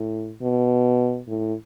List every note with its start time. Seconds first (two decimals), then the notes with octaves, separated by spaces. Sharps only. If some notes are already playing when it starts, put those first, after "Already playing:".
Already playing: A2
0.42 B2
1.28 A2